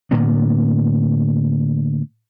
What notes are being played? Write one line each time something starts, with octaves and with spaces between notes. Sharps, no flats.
A2 D3 A#3 B3